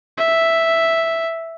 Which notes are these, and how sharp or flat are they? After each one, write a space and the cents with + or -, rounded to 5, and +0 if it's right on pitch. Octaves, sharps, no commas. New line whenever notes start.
E5 +0